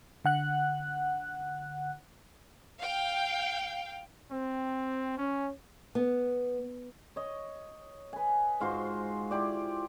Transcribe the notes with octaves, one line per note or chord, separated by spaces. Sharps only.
D3 F#5 F#6
F5 G5
C4
C#4
B3
C#5 D#5
B4 G#5
G#2 F4 F#4 C5
E4 F4 G4 D5